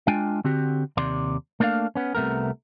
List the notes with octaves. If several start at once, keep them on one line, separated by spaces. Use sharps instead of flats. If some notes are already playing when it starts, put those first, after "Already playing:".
G#3 D4 F4 G5 G#5
D3 C4 F#4 G4
D#2 C3 D5 C6
A3 A#3 D4 C5 F5
B3 C#4
C2 C3 A3 B3 A#4